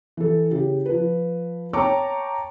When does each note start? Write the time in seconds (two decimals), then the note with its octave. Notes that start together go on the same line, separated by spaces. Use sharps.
0.17 E3 A4
0.51 C#3 E4 G4
0.85 F3 B4
1.73 C#5 G5 A5 A#5 C#6 D6